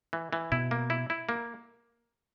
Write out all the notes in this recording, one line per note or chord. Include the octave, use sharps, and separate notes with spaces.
E3
E3
B2 E4
A#3
E4
E4
A#3